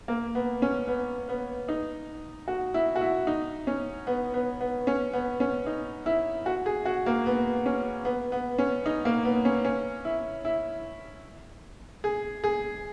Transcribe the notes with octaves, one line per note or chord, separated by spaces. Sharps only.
A#3
B3
C#4
B3
B3
D#4
F#4
E4
F#4
E4
D#4
C#4
B3
B3
B3
C#4
B3
C#4
D#4
E4
F#4
G#4
F#4
A#3
B3
C#4
B3
B3
C#4
D#4
A#3
B3
C#4
C#4
E4
E4
G#4
G#4